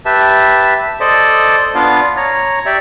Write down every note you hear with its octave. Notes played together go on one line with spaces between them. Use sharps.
G4 B4 E5 A5
A4 C5 D5 D#5
B3 D4 F4 F5
C#5 A#5
G4 D5 E5